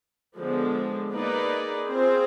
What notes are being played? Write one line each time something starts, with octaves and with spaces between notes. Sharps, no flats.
D3 F3 G#3 B3 D4
A#3 D#4 G#4 B4 D5
C4 F4 G#4 C5